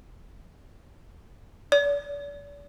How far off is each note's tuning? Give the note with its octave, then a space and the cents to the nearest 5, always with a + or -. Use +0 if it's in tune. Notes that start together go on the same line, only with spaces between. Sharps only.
D5 -40